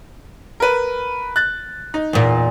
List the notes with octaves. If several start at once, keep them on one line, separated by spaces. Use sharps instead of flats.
A#4 B4
F#6 A6
D#4
E2 A#2